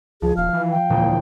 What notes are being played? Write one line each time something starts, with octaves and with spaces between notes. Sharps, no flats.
C#2 F3 G#4
D#1 F5 F6
E3
G5
E1 D2 A#2